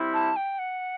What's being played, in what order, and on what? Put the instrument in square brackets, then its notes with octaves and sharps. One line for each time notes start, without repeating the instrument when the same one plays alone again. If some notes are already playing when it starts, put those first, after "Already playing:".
Already playing: [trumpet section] G3 C4 E4
[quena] A5
G5
F#5